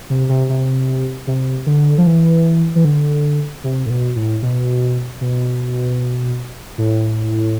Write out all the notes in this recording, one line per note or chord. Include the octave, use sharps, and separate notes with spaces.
C3
C3
C3
C3
D3
F3
E3
E3
D3
C3
A2
B2
A2
B2
B2
A2